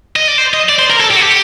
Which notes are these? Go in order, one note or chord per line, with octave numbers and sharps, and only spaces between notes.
D#5
D5
C5
D#5
D5
C5
A#4
A4
G4
F#4
G4